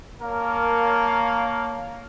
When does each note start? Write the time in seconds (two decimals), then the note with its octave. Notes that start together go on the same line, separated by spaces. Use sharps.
0.21 A#3 A#4 C#5 F5 A5